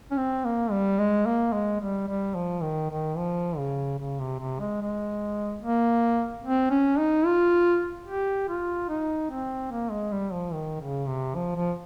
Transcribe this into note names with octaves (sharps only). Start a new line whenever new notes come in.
C#4
C4
A#3
G3
G#3
A#3
G#3
G3
G3
F3
D#3
D#3
F3
C#3
C#3
C3
C3
G#3
G#3
A#3
C4
C#4
D#4
F4
G4
F4
D#4
C4
A#3
G#3
G3
F3
D#3
C#3
C3
F3
F3